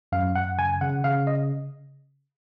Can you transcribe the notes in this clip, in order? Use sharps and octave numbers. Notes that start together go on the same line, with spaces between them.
F#2 F5
F#2 F#5
C#3 G#5
C#3 F#5
C#3 F5
D#5